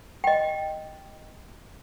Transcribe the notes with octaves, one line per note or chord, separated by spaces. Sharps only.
D#5 G5